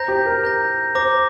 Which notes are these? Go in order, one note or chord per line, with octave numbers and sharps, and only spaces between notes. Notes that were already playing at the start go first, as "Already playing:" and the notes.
Already playing: C5 A#5 G6 A#6
G4
A#4
A#5 G6 A#6
C5 A#5 D6 A#6